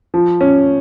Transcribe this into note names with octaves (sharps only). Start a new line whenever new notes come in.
F3
C#4